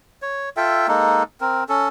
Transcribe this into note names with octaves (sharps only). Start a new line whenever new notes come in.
C#5
F4 A4 E5 G5
G#3 A#3 D#4 A4
C4 A#4
C#4 A4